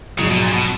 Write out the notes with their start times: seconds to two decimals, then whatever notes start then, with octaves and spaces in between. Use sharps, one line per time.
0.18 A#1 G#2 C#3 F#3
0.30 B2
0.42 A#2
0.53 B2